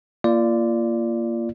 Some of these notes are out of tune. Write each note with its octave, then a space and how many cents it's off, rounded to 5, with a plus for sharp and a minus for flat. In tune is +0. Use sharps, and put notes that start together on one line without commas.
A#3 +0 F4 -30 D5 +0